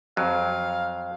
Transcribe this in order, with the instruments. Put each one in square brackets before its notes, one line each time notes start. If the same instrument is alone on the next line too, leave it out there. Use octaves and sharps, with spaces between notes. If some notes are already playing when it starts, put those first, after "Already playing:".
[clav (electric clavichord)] F2 F#3 [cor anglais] F5